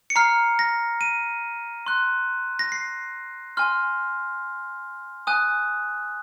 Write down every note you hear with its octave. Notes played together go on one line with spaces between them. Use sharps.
C#7
A#5 F6 C7
A#6
D#7
C6 F#6
A#6
C7
G#5 C6 F6
G#5 D#6 F#6